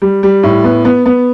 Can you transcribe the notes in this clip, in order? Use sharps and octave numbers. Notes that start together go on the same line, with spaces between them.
G3
G3
A2
B3
B3
B3